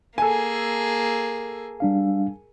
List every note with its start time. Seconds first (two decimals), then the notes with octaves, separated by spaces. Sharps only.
0.18 A#3 G#4 A4 G#5
1.80 G3 D4 F5